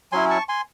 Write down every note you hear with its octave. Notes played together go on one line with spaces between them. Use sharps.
F#3 C#4 E4 G#5 C6
A5 C#6
G#5 C6